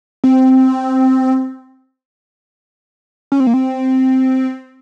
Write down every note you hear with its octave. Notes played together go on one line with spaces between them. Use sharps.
C4
C#4
C4
A#3
C4